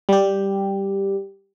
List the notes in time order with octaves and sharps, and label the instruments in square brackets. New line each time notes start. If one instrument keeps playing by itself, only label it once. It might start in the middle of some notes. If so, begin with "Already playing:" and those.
[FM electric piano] G3 G4